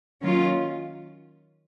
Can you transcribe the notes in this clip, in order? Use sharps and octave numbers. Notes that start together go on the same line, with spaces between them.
D#3 F#3 A#3 C#4 F4